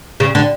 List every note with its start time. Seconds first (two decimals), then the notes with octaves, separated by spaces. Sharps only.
0.20 C#3
0.35 D3